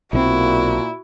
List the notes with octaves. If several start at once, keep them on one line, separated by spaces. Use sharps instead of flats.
B1 A#2 F3 C4 E4 F#4